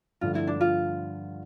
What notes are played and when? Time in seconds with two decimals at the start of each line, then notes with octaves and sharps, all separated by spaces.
0.21 G2 D3 F3 A3 F4
0.35 E4
0.47 D4
0.61 F4